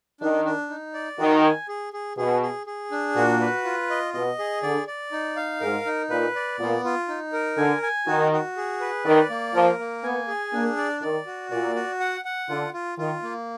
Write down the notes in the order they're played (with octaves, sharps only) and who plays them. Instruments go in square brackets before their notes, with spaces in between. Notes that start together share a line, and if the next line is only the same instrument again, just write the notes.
[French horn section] D#3 [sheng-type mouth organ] D4
[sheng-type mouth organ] D4
D#4
D5
[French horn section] D#3 [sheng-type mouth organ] F#4
[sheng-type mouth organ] G#5
G#4
G#4
[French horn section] B2 [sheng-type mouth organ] G#4
[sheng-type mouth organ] G#4
G#4
D4
[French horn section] A#2 [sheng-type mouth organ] F#4
[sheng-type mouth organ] B4
F4
D#5
[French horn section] B2 [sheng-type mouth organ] D#5
[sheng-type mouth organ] G#4
[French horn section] D3 [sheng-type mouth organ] D5
[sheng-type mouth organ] D5
D#4
F5
[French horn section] G#2 [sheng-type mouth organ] A#4
[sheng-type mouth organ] D#4
[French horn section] A#2 [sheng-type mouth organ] B4
[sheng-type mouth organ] D5
[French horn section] A#2 [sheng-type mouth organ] B3
[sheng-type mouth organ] F4
D#4
A#4
[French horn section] D3 [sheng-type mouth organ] G#5
[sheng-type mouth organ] G#5
[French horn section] D#3 [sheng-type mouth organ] F#4
[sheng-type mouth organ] F#4
G#4
B4
[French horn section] D#3 [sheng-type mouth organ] D5
[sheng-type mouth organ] A#3
[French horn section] F3 [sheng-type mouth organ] A#4
[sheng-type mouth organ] A#3
[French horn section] B3 [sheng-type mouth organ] G#5
[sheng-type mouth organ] G#4
[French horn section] A#3 [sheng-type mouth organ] D4
[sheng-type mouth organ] D5
[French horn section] D#3 [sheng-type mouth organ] D5
[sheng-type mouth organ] F#4
[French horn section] A#2 [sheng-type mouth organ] D5
[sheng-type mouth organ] F#4
F#5
F#5
[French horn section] D3 [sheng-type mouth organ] F4
[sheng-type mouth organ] F4
[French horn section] D#3 [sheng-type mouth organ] F4
[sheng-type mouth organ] A#3